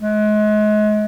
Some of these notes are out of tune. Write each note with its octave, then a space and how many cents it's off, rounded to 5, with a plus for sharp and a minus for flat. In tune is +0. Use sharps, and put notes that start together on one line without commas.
G#3 +35